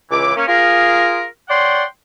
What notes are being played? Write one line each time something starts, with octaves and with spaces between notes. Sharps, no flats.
C#2 E3 D6
A#3 C#4
F4 G#4 A#4
C#5 D5 F#5 G5 C6